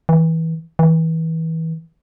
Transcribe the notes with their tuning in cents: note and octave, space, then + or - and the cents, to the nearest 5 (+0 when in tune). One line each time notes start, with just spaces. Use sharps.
E3 -25
E3 -30